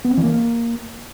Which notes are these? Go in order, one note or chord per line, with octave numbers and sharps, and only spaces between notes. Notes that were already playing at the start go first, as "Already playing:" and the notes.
B3
C4
E3
A#3